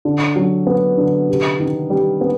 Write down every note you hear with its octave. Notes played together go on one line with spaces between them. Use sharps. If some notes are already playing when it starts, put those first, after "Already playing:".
D3
F#3
B3
D3
C3
D#3
G3
B3